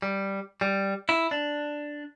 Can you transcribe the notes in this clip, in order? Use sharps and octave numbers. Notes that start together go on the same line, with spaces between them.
G3
G3
E4
D4